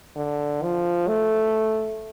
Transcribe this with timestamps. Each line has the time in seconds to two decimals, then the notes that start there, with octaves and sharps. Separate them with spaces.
0.16 D3
0.63 F3
1.08 A3